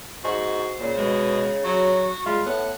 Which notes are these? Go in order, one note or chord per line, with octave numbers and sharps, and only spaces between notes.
G#2 F#4 C5
A#2 C#3
B2 G#3
F#3 F#4
G3 G#3 F4
A2 B3 F#5